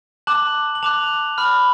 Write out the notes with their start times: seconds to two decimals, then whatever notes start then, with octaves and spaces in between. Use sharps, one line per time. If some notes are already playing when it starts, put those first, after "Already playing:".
0.27 A5 D6 F#6 F#7
0.75 F#7
0.83 A5 D6 F#6 F7
1.38 B5 F6